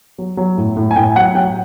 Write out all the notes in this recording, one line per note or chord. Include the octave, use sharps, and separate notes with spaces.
F#3
F#3
A2
A2
G#5
A2 G5
F#3 F#5
F#3 G5